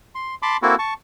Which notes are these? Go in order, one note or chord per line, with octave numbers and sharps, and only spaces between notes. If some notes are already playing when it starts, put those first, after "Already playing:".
C6
A5 B5 C6 D6
A#3 C4 E4 F#4 A4
A5 C#6